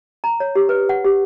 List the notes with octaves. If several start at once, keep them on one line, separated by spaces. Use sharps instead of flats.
A#5
C#5
G4
B4
F#5
G4